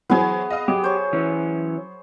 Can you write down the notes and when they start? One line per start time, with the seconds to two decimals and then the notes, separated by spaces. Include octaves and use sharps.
0.10 E3 F#3 B3 G#4 C5
0.50 D#5 F5 D#6
0.68 F#3 G4
0.84 C5 C#5
1.13 E3 C#4